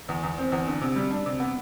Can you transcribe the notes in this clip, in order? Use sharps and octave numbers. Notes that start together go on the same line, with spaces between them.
E2
E2
C4
E2
D3
C3
G3
D4
C3
B3